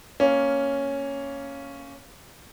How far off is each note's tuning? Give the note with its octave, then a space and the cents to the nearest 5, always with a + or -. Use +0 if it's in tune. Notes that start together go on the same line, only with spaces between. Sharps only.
A#3 -5 C#4 +0